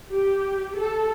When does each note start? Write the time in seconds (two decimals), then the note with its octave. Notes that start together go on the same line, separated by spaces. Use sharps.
0.10 G4
0.77 A4